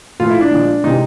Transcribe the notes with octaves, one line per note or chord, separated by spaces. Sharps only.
A#2 F3 A3 F4
E4
D4
A#2 F3 G#3
C3 E3 G#3 D#4